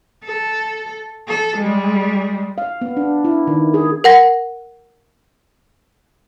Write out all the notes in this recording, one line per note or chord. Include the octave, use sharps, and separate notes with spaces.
A4
A4
G3 G#3
F5
B3
D4
E4
D#3
G#4
A#4 F#5 A#6